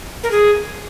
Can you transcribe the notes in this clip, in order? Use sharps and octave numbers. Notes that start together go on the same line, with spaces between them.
A#4
G#4